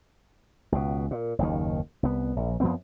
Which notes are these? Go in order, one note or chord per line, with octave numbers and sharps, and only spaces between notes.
C#2 B2
A#2
F#1 D#2 A#2 D#3
C2 B3
A#1
F#2 F3 B3 C4